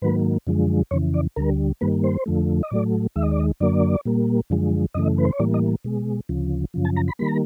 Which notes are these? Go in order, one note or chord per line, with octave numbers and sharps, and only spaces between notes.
G#2 D#3 F#3 A#3 B4
F#2 D3 F3 G#3
F2 C#3 E3 C#5
D5
D2 D3 G3 A#4
G2 D#3 G3 A#3 B4
C5
F2 D3 F3 A3
D#5
A2 F#3 A3 D5
D#2 D#3 G#3 E5
D#5
D5
D#5
F#2 D3 F#3 A#3 D5
A#2 G3 A#3
F#2 D3 F3 G#3
F#2 C#3 E3 A3 D#5
B4
C5
C#5
A2 E3 G3 A#3 D5
D#5
B2 G#3
D2 C#3 F3
F#2 C#3 F3
A5
A#5
B5
D#3 G3 A#3 B5
A#5